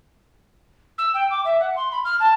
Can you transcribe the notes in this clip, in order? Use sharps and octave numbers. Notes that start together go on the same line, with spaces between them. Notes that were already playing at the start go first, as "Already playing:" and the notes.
E6
G5
D6
E5
F#5
C6
B5
F6
A5